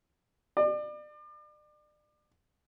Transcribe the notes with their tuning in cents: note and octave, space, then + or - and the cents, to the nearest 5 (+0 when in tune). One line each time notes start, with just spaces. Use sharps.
D5 +35